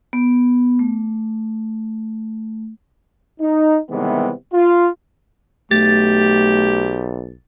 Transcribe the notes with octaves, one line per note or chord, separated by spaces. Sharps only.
B3
A3
D#4
C3 D#3 E3 G3 G#3 B3
F4
B1 A3 G4 A6